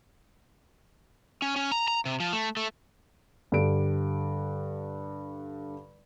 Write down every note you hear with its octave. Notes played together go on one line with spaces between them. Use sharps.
C#4
C#4
A#5
A#5
C3
F3
A3
A3
G2 D3 G4 D7